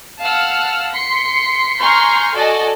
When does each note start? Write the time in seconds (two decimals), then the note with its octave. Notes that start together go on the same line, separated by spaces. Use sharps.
0.20 F5 F#5 A5 E6 F6
0.92 C6 B6 C#7
1.80 G#5 A#5 C6 C#6 F6 G6
2.36 F#4 A4 D5 D#5 G#5 A5